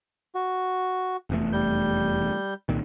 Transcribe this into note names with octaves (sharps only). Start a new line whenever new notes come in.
F#4
F1 E2 A3
G3 G6
C2 A#2 D#3